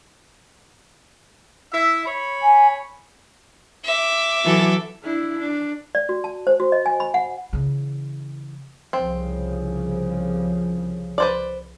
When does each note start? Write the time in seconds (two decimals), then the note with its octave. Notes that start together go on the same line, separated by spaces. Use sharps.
1.72 E4 E5
2.06 C#5 B5
2.42 G#5
3.85 E5 D6
4.44 E3 F#3 A4
5.02 D4 E4
5.39 D4
5.95 D5
6.09 F#4
6.24 A5
6.47 C5
6.60 F#4
6.72 D#5
6.86 G#5
7.00 B5
7.14 F#5
7.53 C#3 E3
8.93 C2 C#3 F3 C4
11.18 B4 C5 D5